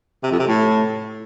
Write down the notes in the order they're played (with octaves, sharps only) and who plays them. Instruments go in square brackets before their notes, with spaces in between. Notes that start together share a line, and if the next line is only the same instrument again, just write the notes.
[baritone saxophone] C3
F2
C3
A2